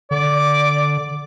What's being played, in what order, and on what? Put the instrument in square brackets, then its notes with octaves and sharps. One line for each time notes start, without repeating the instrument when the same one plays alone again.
[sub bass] D3 [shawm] D5